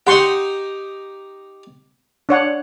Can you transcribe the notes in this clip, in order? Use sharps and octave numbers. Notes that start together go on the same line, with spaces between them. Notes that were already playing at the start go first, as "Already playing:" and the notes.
D#4 G4 F#5 C6 C#6
D4 C#5 F#5